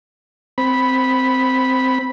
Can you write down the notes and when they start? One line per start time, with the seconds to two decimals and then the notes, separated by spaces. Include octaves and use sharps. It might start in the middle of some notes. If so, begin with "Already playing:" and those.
0.58 C4 B5